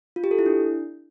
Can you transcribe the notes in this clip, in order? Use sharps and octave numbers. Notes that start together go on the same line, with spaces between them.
F4
G4
A4
E4
D4